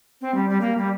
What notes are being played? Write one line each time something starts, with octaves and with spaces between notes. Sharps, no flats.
C4
G3
G3
A#3
G3